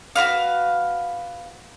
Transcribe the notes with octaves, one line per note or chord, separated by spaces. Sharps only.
F#4 A#4 B4 F5